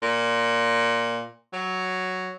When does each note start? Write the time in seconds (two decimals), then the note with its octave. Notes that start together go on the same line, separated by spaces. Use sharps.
0.02 A#2
1.53 F#3